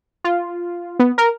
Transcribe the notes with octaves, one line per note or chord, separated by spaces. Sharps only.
F4
B3
A#4